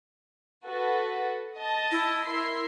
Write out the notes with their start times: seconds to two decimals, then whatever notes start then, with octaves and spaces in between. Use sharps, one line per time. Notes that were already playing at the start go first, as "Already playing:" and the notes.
0.65 F#4 A4 B4
1.56 D#5 A5
1.92 E4
2.25 A#4 E5 C6